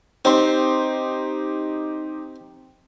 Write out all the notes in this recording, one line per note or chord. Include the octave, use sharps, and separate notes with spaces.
C4 D#4 G4 C6